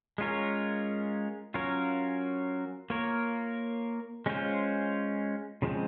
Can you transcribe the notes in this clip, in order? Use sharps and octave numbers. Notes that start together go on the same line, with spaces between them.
G#3 C#4 F4 A#4 C#5
F#3 C#4 F4 A#4 C#5
A#3 F4 A#4 C#5
G#3 C#4 F4 C5
C#3 F3 G#3 C4